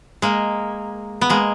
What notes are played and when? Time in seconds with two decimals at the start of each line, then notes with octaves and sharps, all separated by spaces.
0.22 G#3 A#3
1.21 B3
1.30 G#3 A#3